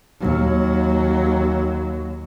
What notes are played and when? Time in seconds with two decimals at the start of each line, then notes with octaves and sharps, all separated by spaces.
0.20 D#2 F#3